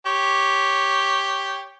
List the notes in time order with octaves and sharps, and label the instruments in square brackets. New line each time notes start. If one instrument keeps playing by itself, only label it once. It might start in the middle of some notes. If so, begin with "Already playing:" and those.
[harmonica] G4 C#5